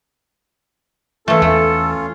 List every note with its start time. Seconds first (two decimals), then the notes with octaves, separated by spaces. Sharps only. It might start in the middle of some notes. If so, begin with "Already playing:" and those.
1.28 E3 A3 C#4 F4 A4
1.42 E2 A3